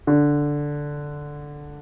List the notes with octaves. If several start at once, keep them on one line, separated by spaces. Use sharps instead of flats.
D3